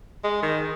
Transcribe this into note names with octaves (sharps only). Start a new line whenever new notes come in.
G#3
D#3